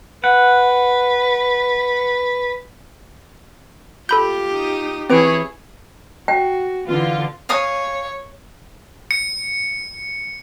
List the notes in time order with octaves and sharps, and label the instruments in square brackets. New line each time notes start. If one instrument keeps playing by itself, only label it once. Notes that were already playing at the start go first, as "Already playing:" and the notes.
[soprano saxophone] B4 [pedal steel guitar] F#5
[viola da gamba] F4 G4 [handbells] A4 B5 G6
[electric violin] D#4 D#6
[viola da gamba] E3 E4 [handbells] C4 B4 D7 [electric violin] G#4 C#5
[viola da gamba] F#4 [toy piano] G5
[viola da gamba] D3 E3 [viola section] F4
[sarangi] C#5 [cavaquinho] F5 G#5 D#6
[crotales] C#7